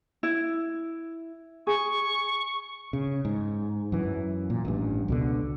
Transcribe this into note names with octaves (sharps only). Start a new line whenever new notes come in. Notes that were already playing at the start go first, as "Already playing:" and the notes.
E4
G#4 C#6
C#3
G#2
F#2 E3
A#2
A1 G2
C#2 B2 D3